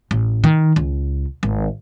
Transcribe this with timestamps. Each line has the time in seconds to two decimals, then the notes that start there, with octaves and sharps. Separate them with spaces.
0.11 A1
0.44 D#3
0.76 C#2
1.43 G#1